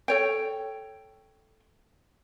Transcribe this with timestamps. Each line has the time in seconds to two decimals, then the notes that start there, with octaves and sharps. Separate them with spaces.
0.08 A4 C#5 G5